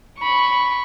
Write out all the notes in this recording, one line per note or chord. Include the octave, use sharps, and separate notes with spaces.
B5 C#6